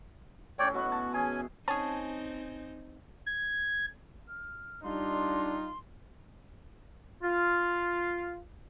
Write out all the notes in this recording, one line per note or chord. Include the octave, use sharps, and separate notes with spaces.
A2 C#4 C#5 D5 G5
B2 F#4 B4 F#5
A5
E3 C#4 G#4 G#5
C4 C#4 D#4 G#4 A5
G#6
F6
G3 D4 D#4 F4 C6
F4